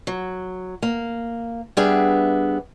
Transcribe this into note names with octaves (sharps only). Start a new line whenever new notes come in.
F#3
A#3
G3 B3 D4 G#4 E5